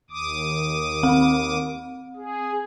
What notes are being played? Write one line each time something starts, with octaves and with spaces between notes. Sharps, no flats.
D#2 D6 D#6
C4
G#4